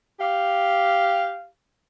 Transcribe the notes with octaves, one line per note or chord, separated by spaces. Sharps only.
G4 F5